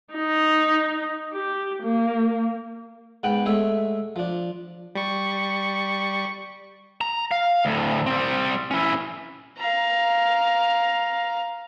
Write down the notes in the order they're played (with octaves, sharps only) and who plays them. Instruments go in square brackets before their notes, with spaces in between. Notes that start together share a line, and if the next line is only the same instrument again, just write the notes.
[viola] D#4
G4
A#3
[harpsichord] G#2 B3 F#5 G5
G#3 A3 C#5 E5
F3 D4
[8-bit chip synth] G3 C#6
[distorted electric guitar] A#5
F5
D2 A2
G3 C4
C#4 E4
[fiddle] F5 A#5